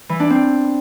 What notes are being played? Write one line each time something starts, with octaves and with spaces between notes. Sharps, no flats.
E3
D4
C4